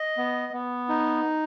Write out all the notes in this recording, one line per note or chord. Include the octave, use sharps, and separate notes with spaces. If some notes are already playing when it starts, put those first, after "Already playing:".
Already playing: D#5
B3
B3
D#4